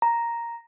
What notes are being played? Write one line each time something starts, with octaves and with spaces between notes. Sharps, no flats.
A#5